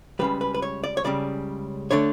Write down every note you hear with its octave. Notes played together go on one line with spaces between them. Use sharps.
C#2 C#3 G3 B4
B4
B4
C#5
D5
C#5
C#2 C#3 G3 D5
D3 A3 D4 C#5